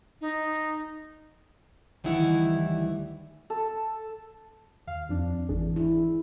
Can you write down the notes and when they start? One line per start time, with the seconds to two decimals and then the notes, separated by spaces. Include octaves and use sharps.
0.21 D#4
2.04 D2 D#3 E3 G3 E4 F#5
3.50 A4
4.87 D#2 F5
5.09 F2 D4
5.49 G#1 E3 D4 G#4
5.76 E4